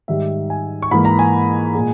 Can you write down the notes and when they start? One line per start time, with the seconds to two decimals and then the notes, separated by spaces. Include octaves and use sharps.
0.08 G#2 D#3 G3 E5
0.50 G#5
0.82 C#6
0.91 G#2 E3 A#3 B5
1.05 A#5
1.19 G#5
1.75 A#2 G#3